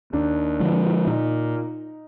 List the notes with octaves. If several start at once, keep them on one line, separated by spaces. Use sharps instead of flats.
D#2 D4
D3 F3 G#3
A#2 D#4